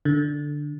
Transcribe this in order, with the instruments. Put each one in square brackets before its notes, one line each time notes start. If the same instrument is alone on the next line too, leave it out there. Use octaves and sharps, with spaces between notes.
[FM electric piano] D3